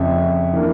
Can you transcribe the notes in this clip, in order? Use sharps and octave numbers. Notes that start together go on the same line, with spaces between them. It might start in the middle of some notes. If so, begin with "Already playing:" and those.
Already playing: F2 C#3 F3 C#4 E5
E3 A#3 D4